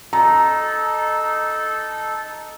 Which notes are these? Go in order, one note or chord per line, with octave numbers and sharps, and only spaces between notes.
D#4 A4 A#5